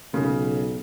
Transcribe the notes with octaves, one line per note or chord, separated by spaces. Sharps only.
B1 C#3